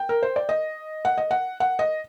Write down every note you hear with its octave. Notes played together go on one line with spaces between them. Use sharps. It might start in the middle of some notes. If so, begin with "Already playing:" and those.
Already playing: G5
A#4
C5
D5
D#5
F#5
D#5
F#5
F#5
D#5